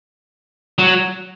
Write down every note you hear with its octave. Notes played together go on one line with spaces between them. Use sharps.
F#3